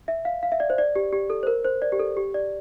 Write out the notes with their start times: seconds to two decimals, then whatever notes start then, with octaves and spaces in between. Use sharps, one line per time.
0.08 E5
0.25 F5
0.43 F5
0.52 E5
0.60 D5
0.70 C5
0.78 D5
0.96 G4
1.13 G4
1.30 A4
1.43 C5
1.47 A#4
1.65 C5
1.82 D5
1.92 G4
2.00 A4
2.17 G4
2.34 D5